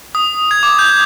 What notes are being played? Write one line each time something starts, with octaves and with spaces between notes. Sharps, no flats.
D#6
G#6
D6
G6